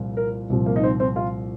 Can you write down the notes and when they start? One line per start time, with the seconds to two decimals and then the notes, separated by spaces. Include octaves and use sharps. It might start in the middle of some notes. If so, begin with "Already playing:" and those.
Already playing: C2 A#2 F3
0.17 A#4
0.50 C2 A#2 F3
0.66 A#3
0.76 D#4
0.83 C4
1.00 C4
1.16 F4